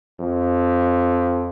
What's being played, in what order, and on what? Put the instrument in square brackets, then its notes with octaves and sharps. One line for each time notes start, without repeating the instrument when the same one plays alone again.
[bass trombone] F2